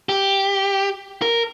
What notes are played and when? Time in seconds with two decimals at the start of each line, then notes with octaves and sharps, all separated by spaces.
0.09 G4
1.22 A#4